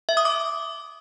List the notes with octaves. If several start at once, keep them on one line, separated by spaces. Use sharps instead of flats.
E5
D#6
D6